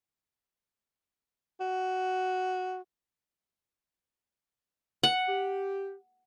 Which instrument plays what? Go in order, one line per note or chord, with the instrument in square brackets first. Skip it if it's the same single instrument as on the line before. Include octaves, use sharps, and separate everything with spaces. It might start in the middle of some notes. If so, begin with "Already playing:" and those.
[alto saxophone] F#4
[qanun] F#5
[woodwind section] G4